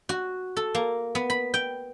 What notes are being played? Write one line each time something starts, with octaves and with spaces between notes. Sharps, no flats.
F#4
A4
A#3
B3
B5
G5